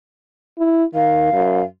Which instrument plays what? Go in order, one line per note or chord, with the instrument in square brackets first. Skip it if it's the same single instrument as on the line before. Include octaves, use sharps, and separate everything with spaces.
[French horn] E4
[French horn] D#3 [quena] F5
[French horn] F#2